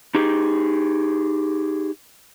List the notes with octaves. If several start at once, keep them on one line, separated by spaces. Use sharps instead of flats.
D#4 G4 G#4